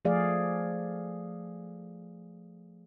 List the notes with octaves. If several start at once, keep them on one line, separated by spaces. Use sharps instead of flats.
F3 A3 G#4 D5 F5